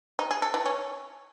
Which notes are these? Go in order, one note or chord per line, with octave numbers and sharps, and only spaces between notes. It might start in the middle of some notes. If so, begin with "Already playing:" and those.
D#4
G#4
A4
E3
C#4